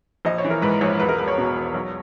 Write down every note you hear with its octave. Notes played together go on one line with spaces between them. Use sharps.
A#1 D#5
C#5
E3
A#4
G#2 B4
A#1 C#5
E1 B4
A#4
E1 B4
C#5
B2
E1
B1